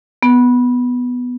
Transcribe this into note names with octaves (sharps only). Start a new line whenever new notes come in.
B3